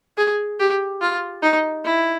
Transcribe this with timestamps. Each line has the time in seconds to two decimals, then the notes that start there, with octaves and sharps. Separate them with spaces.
0.17 G#4
0.60 G4
1.01 F4
1.42 D#4
1.85 E4